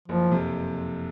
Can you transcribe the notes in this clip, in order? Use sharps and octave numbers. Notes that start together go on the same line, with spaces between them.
F#1 F3
F2 C3